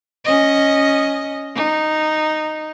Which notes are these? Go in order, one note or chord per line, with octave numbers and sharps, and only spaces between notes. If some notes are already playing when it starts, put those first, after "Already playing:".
C#4 D#5
D#4